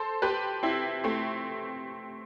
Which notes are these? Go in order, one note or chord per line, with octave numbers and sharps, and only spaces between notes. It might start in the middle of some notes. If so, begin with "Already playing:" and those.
Already playing: A4 C5
G4 B4
C4 E4
A3 C4